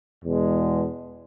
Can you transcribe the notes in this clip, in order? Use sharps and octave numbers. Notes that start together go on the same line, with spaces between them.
E2 B2 G#3